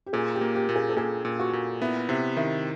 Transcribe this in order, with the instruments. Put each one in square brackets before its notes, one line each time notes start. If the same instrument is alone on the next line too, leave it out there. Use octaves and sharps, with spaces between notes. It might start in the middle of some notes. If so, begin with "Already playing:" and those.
[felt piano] G4
[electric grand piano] A#2 [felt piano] G#4
[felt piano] G4
[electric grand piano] A#3
[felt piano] G4
[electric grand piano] A#2
[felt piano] G#4
A4
[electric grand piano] A#2 [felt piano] G#4
[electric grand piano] A#2
[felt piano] F#4
[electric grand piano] A#2
[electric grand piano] B3 [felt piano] E4
[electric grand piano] C3 [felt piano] E4
[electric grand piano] D#3 [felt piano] E4